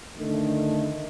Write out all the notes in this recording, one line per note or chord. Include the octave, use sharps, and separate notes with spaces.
D3 D#3 A3